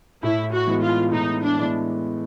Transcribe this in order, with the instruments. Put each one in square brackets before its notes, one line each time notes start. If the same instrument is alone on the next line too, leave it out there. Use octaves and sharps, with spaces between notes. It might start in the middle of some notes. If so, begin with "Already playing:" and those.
[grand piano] A2 [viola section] E4
[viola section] F#4
[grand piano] E3 G#3 B3
[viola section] F4
[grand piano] A2 [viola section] D#4
[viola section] D4
[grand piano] E3 G#3 B3